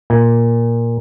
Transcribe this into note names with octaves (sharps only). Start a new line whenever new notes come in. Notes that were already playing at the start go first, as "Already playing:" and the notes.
A#2